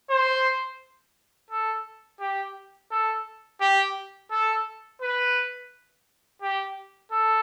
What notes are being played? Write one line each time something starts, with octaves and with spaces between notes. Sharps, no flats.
C5
A4
G4
A4
G4
A4
B4
G4
A4